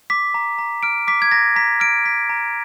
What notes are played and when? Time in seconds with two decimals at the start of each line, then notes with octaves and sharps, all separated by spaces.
0.10 D6 B6
0.34 A#5
0.59 A#5
0.83 F6 D7
1.07 D6 B6
1.22 G#6
1.31 A#5 A#6
1.56 A#5 B6
1.80 F6 D7
2.05 D6 B6
2.29 A#5